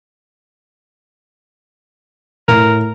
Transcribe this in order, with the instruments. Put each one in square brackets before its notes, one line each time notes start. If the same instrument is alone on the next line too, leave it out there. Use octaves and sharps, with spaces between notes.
[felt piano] A2 [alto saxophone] A#4